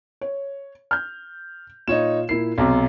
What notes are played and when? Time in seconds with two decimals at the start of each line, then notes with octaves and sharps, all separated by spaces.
0.21 C#5
0.91 F6 G6
1.88 A#2 D#4 F4 C#5 E7
2.29 A#2 E4 A#4 C7
2.58 B1 C3 F#4 A#5 D6